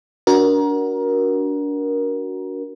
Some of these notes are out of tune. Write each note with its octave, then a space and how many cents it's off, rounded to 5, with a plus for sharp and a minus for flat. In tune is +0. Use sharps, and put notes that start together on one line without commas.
D4 -30 F#4 +0 A#4 +20